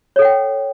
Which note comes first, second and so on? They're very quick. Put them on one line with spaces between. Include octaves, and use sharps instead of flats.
C#5 A4 F#5 G5